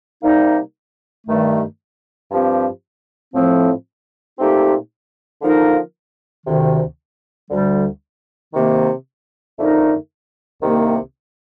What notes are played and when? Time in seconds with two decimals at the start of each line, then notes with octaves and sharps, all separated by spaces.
0.22 C3 G3 A#3 D#4
1.27 G2 D#3 A3
2.29 G2 F3 C4 G4
3.34 A2 F3 C4
4.38 A#2 A3 C4 D#4 G4
5.42 D3 F3 A#3 D#4 A#4
6.45 D2 C3 D#3
7.50 D2 D3 G3
8.54 C3 D#3 A#3
9.57 F2 D3 A3 D#4 A#4
10.61 C2 C3 D#3 A#3